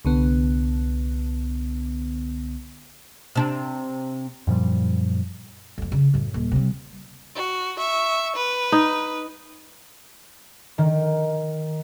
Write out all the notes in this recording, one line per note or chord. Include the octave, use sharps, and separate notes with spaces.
C2 D3 B3
C3 D4
F#2 A#2 F3 G3
F2 A2
C#3
F#2 A2
D#1
C3 G3
F#4
E5 C#6
B4
D#4
D#3